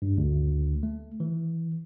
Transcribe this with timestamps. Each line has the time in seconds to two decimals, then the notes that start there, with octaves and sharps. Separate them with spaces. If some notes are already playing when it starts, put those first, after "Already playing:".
0.02 G2
0.17 D2
0.83 A3
1.20 E3